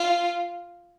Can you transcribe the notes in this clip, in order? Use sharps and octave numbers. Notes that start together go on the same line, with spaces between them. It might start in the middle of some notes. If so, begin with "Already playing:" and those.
Already playing: F4